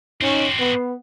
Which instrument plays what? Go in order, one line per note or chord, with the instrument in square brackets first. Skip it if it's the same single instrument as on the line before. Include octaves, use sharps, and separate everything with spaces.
[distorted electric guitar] C4 F#4 [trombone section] C#4 D#4
[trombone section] B3